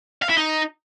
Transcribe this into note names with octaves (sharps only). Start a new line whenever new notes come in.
F5
E4
D#4